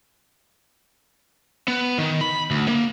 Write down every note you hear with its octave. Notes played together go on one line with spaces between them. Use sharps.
B3
D#3
B5
D2
A#3